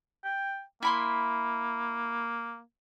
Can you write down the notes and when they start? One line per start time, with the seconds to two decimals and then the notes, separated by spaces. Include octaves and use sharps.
0.25 G5
0.83 A#3 E4 B5 C6